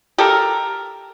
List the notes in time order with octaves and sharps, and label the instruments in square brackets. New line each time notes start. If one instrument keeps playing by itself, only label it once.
[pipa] G4 A4 A#4